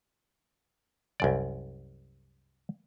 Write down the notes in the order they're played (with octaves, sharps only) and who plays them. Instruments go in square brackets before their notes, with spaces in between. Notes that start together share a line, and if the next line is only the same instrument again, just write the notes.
[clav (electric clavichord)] C2 F#2 D5